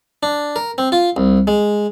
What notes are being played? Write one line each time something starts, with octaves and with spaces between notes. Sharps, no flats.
D4
A#4
C4
F4
C2
G#3